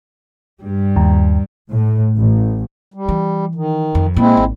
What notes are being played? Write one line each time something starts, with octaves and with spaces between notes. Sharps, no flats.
G2 G3
D#2
A2
A1
G3
E3
D#3
F2
A#2 G#3 C4 E4
G#1